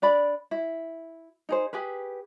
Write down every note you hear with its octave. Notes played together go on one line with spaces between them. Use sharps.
D4 D5 B5
E4
D#4 G#4 C5
G4 G#4 B4